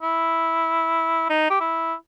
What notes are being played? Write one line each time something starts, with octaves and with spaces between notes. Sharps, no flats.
E4
D#4
G4
E4